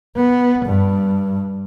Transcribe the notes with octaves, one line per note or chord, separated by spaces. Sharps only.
B3
G2